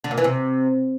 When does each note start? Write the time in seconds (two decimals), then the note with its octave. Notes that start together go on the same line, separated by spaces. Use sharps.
0.04 D3
0.11 A#2
0.18 E3
0.24 C3